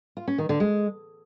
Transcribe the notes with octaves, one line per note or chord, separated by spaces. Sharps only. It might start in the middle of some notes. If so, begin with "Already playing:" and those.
F4
C#4
D#3
D3
G#3